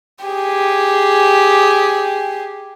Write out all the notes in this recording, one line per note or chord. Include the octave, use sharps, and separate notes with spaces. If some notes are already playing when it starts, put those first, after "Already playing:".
G4 G#4